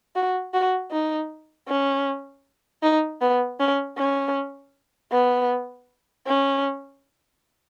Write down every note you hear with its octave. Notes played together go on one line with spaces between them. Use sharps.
F#4
F#4
D#4
C#4
D#4
B3
C#4
C#4
B3
C#4